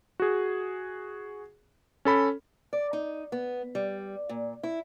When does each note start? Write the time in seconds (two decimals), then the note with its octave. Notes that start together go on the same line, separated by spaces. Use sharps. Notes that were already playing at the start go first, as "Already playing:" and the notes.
0.20 F#4 G#4
2.05 C#4 A4 B5
2.73 D5
2.93 D#4
3.32 B3
3.75 G3
4.29 A#2
4.63 E4